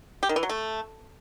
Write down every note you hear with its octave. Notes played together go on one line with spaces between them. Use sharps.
G4
D#3
E3
F#3
A3